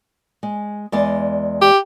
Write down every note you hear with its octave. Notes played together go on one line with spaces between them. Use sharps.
G#3
E2 G#3 D5
G4